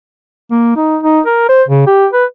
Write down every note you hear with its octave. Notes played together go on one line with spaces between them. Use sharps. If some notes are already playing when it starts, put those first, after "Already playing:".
A#3
D#4
D#4
A#4
C5
C#3
G4
B4